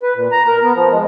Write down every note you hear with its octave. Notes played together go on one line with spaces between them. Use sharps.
B4
A#2
A#5
A#4
B3
F3
G#3